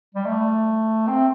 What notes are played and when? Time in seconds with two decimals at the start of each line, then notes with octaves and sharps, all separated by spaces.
0.15 G3
0.26 A3
1.08 C4